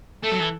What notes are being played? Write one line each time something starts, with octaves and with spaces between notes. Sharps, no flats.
A3 A4
F#3
E3